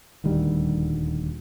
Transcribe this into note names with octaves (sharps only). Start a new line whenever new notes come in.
D#1 D2 D#3 G3